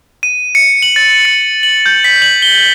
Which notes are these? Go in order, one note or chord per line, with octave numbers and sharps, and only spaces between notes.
D#7
C#7
F#7
A6
C#7
F#7
G6
B6
F#7
G7